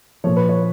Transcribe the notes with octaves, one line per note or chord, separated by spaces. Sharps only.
A#2 F3 C#5
B4
C#5